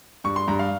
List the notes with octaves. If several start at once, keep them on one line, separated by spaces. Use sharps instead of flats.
G2 C#6
C6
G2 A#5
F5